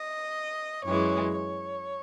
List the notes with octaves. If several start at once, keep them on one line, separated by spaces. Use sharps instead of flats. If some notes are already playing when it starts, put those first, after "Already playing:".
Already playing: D#5
F#2 E3 G#3 C#5
C#5